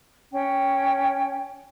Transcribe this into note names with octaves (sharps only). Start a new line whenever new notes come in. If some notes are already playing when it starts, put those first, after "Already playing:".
C#4 G5